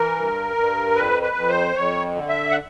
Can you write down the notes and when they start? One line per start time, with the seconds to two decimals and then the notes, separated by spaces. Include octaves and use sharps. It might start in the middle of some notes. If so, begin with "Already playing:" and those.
Already playing: E3 A#4
0.15 G2
0.56 G2
0.95 F2 B4
1.22 B4
1.36 F2
1.49 C5
1.75 F2 C#5
2.15 D3
2.29 E5
2.51 F#5